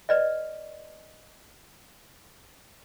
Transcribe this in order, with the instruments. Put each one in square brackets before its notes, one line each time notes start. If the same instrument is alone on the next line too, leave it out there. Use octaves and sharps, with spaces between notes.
[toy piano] B4 D5 D#5